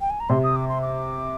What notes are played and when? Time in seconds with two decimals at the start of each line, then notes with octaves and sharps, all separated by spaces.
0.01 G5
0.10 G#5
0.20 A#5
0.29 C3 C6
0.43 D#6
0.56 D6
0.69 C6
0.82 D6